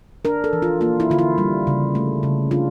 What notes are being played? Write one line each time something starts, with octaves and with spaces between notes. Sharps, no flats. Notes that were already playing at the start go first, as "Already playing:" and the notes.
D4 A#4
A4
E3
F4
A#3 F4
E4
D3 F4
E4
G3
C#3
A3
C#3
D4 F4